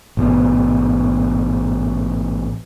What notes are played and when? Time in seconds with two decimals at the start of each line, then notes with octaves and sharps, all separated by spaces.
0.17 A1 G#2 B2 B3